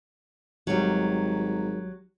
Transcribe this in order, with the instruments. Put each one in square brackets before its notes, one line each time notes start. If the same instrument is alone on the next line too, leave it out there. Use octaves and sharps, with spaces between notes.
[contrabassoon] G#1 [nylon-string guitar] F#3 G3